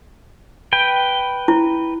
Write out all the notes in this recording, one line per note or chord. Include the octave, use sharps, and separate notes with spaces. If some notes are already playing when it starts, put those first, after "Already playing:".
B4 G5
E4